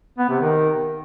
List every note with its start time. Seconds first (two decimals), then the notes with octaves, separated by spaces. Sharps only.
0.18 B3
0.30 C3
0.41 D#3